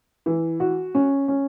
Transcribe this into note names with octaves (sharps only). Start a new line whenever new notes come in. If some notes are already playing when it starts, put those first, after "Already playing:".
E3
F#4
C#4
C#4